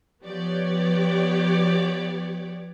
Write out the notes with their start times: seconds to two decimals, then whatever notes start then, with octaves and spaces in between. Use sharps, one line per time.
0.23 F3 B3 G4 C#5 D5